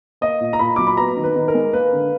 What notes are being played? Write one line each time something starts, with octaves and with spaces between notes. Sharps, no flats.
A#3 D#5
A#2
A#5
A#2 B5
F#3 D6
B5
B3 A#5
D#3
B4
D#3
A#4
G#3
A#3 B4
D3